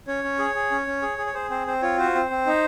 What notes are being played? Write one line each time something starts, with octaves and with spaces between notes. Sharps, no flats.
C#4 C#5
C#4
G#4
G#4
C#4
C#4
G#4
G#4
C#5
G#4 C5
C4 C5
C4 C5
F4 C#5
F#4 C5
C4
C4
D#4